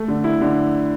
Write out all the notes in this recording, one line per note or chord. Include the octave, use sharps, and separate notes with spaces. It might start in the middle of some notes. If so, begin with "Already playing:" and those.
Already playing: A3
D3
E4
D3